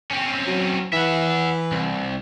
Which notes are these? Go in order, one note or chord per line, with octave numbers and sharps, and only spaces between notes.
C4 C#4
F#3
E3 E5 F#5
C2